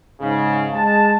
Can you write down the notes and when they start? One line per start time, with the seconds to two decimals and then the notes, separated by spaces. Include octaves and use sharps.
0.21 G#2 C#3
0.72 G#3 A5